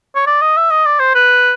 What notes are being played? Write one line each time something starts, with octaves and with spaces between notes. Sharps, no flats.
C#5
D5
D#5
E5
D#5
D5
C5
B4